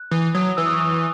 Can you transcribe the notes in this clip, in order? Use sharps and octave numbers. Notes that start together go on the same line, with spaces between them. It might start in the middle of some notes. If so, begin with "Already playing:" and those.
Already playing: F#6
E3 D#6
F#3 D#6
E3 E6
D#6
C#6
D#6